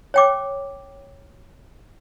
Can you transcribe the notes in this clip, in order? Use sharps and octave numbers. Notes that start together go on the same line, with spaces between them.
C#5 G5 D6